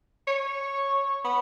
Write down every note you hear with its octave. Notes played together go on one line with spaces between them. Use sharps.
C#5
B3